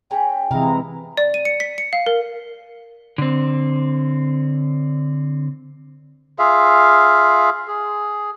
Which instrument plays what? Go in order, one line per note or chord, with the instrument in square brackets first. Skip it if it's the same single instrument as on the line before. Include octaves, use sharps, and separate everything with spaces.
[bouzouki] C#4 G#4 A#5 [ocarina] G5
[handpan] C3 E3 [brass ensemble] G#3 E4 A#5 [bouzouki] F5
[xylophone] D5
D#7
C#7
B6
C#7
F5
A#4
[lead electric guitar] D3 C4
[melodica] F4 G#4 E5 F5
G#4